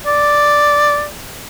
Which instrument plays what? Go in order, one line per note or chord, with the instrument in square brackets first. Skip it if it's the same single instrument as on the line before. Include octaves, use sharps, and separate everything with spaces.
[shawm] D5